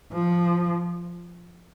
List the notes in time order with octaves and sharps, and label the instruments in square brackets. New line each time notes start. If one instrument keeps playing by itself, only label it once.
[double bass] F3